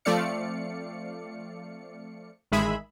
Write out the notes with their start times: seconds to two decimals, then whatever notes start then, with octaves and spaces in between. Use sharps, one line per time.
0.05 F3 A3 C4 D5 F5 C#7
2.52 A1 D#3 G#3 G#4 E5 B5